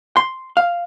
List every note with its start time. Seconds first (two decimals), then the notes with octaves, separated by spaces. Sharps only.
0.17 C6
0.57 F5